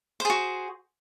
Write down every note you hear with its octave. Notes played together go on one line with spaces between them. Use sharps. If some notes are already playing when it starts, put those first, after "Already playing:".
F#4 G#4 C5